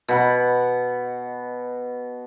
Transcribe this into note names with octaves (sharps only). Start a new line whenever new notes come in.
B2 F#5 B5